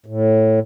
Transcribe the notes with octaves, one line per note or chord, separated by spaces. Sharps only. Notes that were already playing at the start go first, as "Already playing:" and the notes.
A2